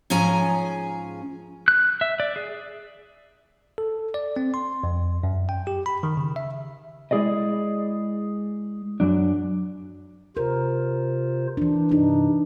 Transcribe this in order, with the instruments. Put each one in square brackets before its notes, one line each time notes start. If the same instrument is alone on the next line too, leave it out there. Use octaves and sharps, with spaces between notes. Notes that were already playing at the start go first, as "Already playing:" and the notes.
[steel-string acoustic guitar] G#2 F3 C#4 G#4 G#5 A#5
[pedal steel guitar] F#6
E5
D5
G#4
[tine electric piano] A4
D5
C4
C6
F2
F#2
G5
G4
B5
D#3
C#3
E5
[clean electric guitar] G#3 E4 G#4 D5 D#5
F#2 F#3 D4
[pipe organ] C3 F4 C5 [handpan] A#4
[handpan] E3 D4
[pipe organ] G2 C3 [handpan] D4 D#4